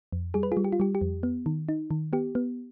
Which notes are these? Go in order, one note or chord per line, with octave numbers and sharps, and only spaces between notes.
F2
G3 G#4
B4
F4 G#4
G3
G4
F4
G3 G4
G4
F2
B3
D#3
D#4
D#3
B3 G4
B3